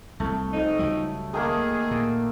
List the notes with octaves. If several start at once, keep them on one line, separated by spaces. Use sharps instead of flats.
C2 A3
F2 D#4
C#2 F#3 G3
D#3 A3 A#3 G#4
A#2